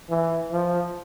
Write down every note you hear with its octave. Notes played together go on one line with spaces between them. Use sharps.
E3
F3